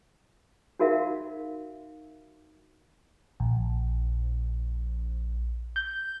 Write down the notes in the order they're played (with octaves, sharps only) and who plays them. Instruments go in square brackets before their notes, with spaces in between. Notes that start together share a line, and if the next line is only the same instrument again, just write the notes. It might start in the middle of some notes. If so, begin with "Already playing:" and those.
[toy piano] D#4 F#4 A#4 E5 F5
[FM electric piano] A#1
G6